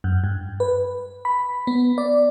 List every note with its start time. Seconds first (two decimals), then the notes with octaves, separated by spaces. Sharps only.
0.04 F#2
0.24 G2
0.60 B4
1.25 B5
1.67 B3
1.98 D5